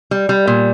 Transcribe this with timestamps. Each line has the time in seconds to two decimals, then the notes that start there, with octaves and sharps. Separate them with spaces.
0.11 G3
0.29 G3
0.47 A#2